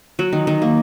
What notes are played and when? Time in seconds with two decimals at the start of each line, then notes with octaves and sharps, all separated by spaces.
0.19 F#3
0.33 D#3
0.47 D#3
0.62 A#3